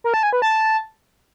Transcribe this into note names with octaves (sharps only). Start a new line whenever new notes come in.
A#4
A5
G#5
B4
A5